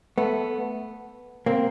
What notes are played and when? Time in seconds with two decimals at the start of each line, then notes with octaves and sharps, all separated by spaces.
0.18 A3 B3
1.46 A#3 C4